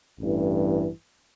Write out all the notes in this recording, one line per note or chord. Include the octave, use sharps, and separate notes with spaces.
A1 G2 E3